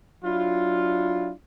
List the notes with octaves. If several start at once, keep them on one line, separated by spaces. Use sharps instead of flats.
F#3 D4 E4 F4